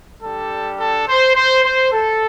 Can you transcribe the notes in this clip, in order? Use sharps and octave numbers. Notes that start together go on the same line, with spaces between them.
G3 D4 G4 A4
A4
C5
C5
C5
A4